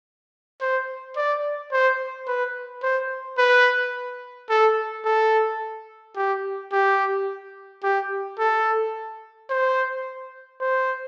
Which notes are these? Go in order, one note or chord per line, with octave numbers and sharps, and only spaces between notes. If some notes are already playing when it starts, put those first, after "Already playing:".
C5
D5
C5
B4
C5
B4
A4
A4
G4
G4
G4
A4
C5
C5